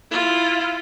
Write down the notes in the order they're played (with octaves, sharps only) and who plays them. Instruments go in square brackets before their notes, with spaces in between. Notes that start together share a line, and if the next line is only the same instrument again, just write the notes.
[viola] E4 F4